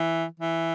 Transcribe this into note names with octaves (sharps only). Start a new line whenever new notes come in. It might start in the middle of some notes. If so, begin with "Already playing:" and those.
Already playing: E3
E3